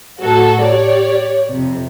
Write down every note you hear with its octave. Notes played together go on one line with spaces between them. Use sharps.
A2 F#3 F#4 A4
G4 C#5 D5
F2 C3